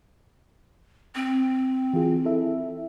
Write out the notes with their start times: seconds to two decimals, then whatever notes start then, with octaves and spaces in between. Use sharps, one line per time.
1.15 C4
1.94 E3 F4 G#4
2.25 E4 A4 E5